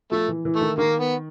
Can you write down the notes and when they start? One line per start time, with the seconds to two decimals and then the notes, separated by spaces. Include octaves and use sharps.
0.12 F3 A3
0.28 E3
0.45 E3
0.56 A3
0.61 D#3
0.78 D#3 A#3
0.99 B3